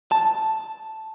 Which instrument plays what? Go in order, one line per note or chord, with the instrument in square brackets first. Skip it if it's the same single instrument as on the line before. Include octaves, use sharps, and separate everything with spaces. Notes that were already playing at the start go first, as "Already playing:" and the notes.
[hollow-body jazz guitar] A5